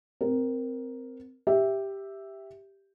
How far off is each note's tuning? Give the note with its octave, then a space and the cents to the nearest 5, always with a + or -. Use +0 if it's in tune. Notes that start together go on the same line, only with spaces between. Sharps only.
C4 -10 A#4 +0
G4 +0 E5 +0